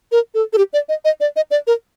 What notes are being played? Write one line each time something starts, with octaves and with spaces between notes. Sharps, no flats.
A#4
A4
A4
G4
D5
D#5
D#5
D5
D#5
D5
A#4